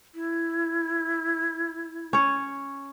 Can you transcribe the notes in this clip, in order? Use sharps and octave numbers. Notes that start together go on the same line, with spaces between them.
E4
C#4 C#5